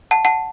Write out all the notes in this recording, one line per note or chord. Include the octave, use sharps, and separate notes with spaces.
F#5 A5
F#5 A5